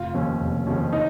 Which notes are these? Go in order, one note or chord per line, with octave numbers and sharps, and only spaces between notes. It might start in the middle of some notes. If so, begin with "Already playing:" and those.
Already playing: F1 F4 F5
D#2 C#3 F3 C#4
F1
D#2 C#3 F3 C#4
D#4 D#5